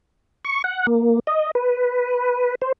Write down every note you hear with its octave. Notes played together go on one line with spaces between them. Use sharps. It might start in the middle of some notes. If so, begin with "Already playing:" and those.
C#6
F#5
A#3
D#5
B4
C5